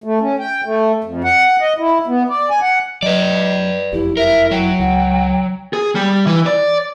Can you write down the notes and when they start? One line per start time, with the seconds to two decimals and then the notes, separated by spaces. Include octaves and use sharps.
0.04 A3
0.21 C#4
0.39 G5
0.65 A3
1.04 F2
1.24 F#5
1.61 D#5
1.78 E4
2.07 B3
2.29 D5
2.50 G#5
2.62 F#5
3.03 F#3 B4 D5 D#5
3.92 F#1 F2 E4 G4
4.17 E4 A#4 E5
4.51 F#3 G5
4.79 C#2 F#5
5.73 G#4
5.95 G3
6.27 E3
6.46 D5